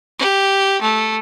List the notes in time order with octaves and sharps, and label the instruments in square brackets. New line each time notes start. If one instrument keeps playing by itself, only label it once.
[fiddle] G4
A3